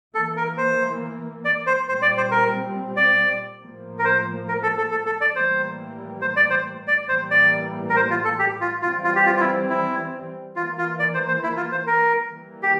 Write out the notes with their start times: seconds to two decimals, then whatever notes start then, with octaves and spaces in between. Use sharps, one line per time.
0.15 E3 A#3 A4
0.37 A#4
0.57 C5
1.45 D5
1.66 C5
1.88 A#2 G3 C4 C5
2.02 D5
2.17 C5
2.31 A#4
2.97 D5
3.61 A2 F3 A#3
3.99 A#4
4.05 C5
4.48 A#4
4.63 A4
4.78 A4
4.91 A4
5.06 A4
5.21 D5
5.35 A2 E3 G3 A#3 C5
6.22 C5
6.36 D5
6.50 C5
6.88 D5
7.08 A2 E3 G3 A#3 C5
7.31 D5
7.90 A#4
7.96 C5
8.10 F4
8.24 A4
8.39 G4
8.61 F4
8.82 E3 G3 C4 F4
9.04 F4
9.16 G4
9.26 F4
9.36 F4
9.40 E4
9.69 E4
10.56 E3 F4
10.61 A#3
10.78 F4
10.99 D5
11.14 C5
11.28 C5
11.43 E4
11.57 F4
11.72 C5
11.87 A#4
12.29 E3 G3 A#3
12.63 G4